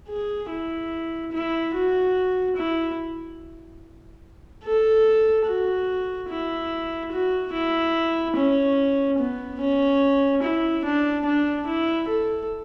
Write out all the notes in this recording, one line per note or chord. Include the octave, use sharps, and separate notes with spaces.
G#4
E4
E4
F#4
E4
A4
F#4
E4
F#4
E4
C#4
B3
C#4
E4
D4
D4
E4
A4